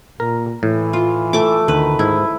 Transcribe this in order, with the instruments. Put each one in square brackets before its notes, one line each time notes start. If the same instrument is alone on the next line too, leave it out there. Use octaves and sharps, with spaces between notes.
[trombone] A#2 [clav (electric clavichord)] A#4
[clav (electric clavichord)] A2 [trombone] E3
[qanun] F4
A3 D6
[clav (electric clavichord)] D2 [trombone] D#3 [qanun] B4
[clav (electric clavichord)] G#2 [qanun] E4